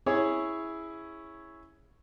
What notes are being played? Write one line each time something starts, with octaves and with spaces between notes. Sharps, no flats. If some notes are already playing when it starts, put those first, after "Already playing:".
C#4 E4 G#4 C#5